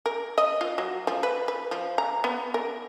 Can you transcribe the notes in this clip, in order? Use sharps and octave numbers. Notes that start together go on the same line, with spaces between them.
A#4
D#5
F4
F#3
F3
B4
B4
F3
A#5
B3
A#4